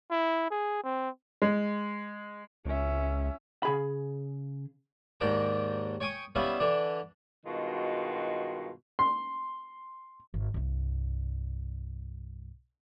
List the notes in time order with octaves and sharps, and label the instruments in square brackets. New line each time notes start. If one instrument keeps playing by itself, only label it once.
[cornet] E4
G#4
C4
[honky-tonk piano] G#3
[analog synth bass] C#2 [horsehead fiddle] C#4 E5
[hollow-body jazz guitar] C#3 G#4 B5
[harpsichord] D#2 G#2 D4 G5 A#5
C#5 G5 G#5 C#6 D#6
G3 B3 C#4 E4 E5 F5
D3 E3 D4
[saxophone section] G2 B2 D#3 G#3 F4 F#4
[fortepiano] C6
[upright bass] G#1
C2 G2